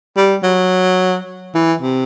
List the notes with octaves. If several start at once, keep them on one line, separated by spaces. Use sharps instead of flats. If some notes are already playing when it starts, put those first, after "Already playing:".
G3
F#3
E3
C3